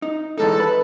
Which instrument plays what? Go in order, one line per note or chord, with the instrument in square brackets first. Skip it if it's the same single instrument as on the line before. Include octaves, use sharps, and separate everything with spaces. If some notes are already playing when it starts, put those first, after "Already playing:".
[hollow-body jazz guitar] D#4
[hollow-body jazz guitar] E3 G#3 D#4 [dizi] A4
[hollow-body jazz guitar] B4